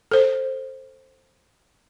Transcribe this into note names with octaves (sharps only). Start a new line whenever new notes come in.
A4 C5